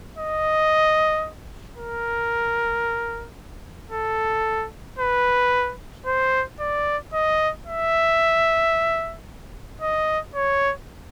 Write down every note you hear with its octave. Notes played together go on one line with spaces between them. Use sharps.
D#5
A#4
A4
B4
C5
D5
D#5
E5
D#5
C#5